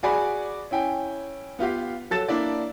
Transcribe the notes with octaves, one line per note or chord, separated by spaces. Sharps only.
F#4 G#4 D5 G#5 B5
C#4 E4 G5 G#5
B3 F4 G4 F5
F#3 A4 A6 E7
A#3 D4 E4 D5